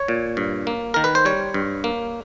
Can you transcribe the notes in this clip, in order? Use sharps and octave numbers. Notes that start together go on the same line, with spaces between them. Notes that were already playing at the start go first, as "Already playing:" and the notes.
Already playing: C#5
A#2
G2
A#3
D#3 A#4
B4
C5
G3 C#5
G2
A#3